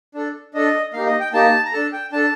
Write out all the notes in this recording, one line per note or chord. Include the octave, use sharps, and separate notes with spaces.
D4 A4
D4 A4 D#5
A#3 D#4 G4 F5
D#5
G5
A#3 D#4 G4 A5
A#5
D4 A4 A5
G5
D4 A4 A5